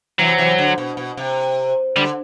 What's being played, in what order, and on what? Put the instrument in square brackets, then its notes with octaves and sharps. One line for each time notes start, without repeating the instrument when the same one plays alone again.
[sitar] C3 E3 [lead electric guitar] F#3
[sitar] C3 E3
D3
B2
B2
C3
[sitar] D3 [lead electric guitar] G3